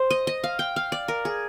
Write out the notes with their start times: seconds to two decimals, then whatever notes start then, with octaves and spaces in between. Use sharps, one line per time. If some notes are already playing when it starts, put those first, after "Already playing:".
Already playing: C5
0.10 D#5
0.27 D#5
0.44 F5
0.59 G5
0.76 F5
0.92 D5
1.08 A#4
1.25 G#4